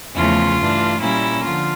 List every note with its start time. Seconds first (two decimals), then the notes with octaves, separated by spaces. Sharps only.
0.15 E2 C#3 F3 A3 C#4 F4
0.57 G2 E3 A3 D4
1.00 A#2 G3 A#3 C#4 E4
1.43 D3 F3 F4